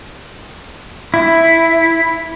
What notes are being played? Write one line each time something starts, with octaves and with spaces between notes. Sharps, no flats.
E4